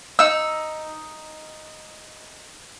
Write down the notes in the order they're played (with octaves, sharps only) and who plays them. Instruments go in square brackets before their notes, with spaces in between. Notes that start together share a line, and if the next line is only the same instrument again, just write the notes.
[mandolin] D#4 E6